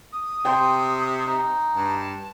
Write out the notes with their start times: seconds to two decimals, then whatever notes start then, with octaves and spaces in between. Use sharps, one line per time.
0.12 D#6
0.45 C3 G5 C6
1.26 D#4
1.75 G2 A5